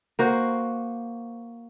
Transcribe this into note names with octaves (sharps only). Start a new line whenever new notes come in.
A#3 F#4 C5